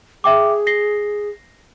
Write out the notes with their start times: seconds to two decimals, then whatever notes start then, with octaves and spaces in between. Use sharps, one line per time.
0.24 G#4 E5 G5 D6
0.67 A#6 C7 G7